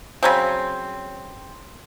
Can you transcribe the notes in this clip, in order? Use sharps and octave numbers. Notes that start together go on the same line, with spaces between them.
C#3 F#3 C4